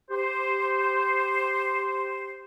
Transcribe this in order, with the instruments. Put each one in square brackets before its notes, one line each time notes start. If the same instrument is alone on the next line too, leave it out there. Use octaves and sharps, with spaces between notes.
[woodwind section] G4 C5